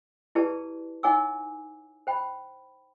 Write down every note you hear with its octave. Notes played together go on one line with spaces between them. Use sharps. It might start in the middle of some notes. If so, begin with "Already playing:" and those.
E4 G4 G#4 B4 D5 A5
D#4 C#5 F#5 G#5 D6 E6
C5 G5 B5